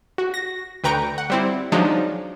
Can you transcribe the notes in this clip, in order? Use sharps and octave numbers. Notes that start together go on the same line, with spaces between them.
F#4
A#6
D2 B4 G5 A#5 C#6 D7
F#5
G3 C4 E4
F3 F#3 G#3 D4 D#4